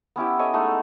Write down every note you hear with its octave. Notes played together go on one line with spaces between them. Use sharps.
B3 C#4 E4 G4
A4 C#5 D#5 E5
G#3 A3 D#4 F#5